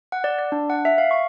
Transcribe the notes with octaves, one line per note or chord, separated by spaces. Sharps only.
F#5
D5
D5
D4
F#5
E5
F5
C#6